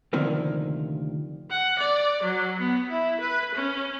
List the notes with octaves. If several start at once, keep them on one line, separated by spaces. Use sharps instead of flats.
D2 C3 D#3 F3 A#3
F#5
D5
F#3
B3
E4
B4
C#4